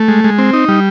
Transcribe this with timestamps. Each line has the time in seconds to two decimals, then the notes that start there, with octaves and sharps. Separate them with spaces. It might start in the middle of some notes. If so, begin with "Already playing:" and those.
Already playing: A3
0.08 G#3
0.24 G#3
0.38 C4
0.53 D#4
0.69 G3